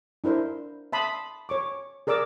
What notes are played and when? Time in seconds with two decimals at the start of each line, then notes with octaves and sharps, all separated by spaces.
0.24 D4 E4 A#4 C5 E5
0.92 E5 A5 B5 C6 D#6
1.49 C#5 C#6 D6
2.07 G#4 A#4 D5 D6 E6